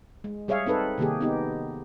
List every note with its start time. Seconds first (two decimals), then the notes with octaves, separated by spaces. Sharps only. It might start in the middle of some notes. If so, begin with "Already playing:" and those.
0.24 G#3
0.48 G3 G#4 C#5 E5 F5
0.66 C4 D#4 A4 B4
0.98 C3 D#3 A#3 G4 G#4
1.21 B3 D#4 G4